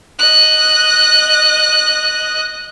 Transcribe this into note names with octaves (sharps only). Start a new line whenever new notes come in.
D#5 F#6